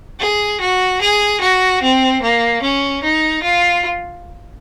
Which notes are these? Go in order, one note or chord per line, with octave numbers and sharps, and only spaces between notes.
G#4
F#4
G#4
F#4
C4
A#3
C#4
D#4
F4